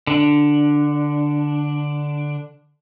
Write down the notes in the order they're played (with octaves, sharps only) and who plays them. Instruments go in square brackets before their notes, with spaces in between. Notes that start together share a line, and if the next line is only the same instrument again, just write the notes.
[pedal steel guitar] D3 D4